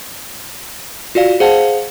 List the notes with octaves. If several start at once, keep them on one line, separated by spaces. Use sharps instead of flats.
F4 F#4 D5 F5
G#4 C5 F5 F#5 A5